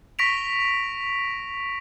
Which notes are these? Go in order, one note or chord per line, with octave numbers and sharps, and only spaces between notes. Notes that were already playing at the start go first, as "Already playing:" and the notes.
C#6 A#6 B6 D7 F7